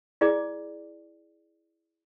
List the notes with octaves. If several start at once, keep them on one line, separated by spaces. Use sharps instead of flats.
E4 G#4 D5 G#5 D6